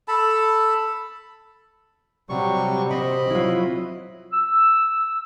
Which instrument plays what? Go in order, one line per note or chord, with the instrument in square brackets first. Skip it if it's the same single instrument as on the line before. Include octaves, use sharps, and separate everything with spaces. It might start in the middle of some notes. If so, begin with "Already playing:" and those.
[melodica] A4 A5 B5
[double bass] C3 [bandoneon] F#3 G3 C#6
[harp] C4 [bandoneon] D#5 B5
[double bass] F#3 [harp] E4 F4
[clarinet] E6